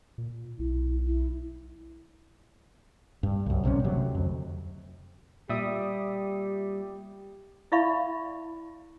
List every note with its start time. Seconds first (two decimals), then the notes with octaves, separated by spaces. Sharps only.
0.18 A#2
0.59 B1 E4
1.07 E4
3.23 G2
3.46 C2 F#2
3.64 A#1 C3 F3 C#4
3.84 D2 C3 F#3
4.15 F2
5.49 A#2 G3 G4 E5 D#6
7.72 E4 D5 E5 F5 B5 C#6